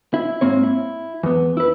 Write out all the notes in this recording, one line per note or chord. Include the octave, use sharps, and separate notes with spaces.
E4
G#2 A#3 C4 C#5
E4
E2 B3
E4 B4